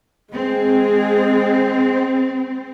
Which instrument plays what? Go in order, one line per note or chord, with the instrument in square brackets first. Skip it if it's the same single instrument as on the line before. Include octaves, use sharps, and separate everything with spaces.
[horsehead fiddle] G#3 G#4 [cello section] C4